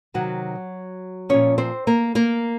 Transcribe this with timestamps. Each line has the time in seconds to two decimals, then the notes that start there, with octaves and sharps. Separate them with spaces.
0.14 C3 D#3 F#3 F#4
1.29 A#2 F3 C#4 C#5
1.58 C4 C5
1.87 A#3 A#4
2.15 A#3 A#4